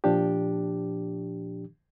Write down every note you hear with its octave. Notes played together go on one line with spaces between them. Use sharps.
A#2 F3 D4 G4